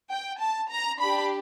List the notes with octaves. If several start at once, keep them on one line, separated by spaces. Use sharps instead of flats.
G5
A5
A#5
D4 G4 B5